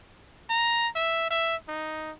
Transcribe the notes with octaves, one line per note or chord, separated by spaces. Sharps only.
A#5
E5
E5
D#4